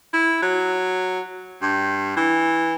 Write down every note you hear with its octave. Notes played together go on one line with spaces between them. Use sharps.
E4
F#3
G2
E3